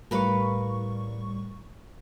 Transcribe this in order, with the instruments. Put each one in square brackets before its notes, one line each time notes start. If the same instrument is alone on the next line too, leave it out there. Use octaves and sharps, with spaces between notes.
[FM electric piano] A2 G3 C#6 [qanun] A#4 B4 F5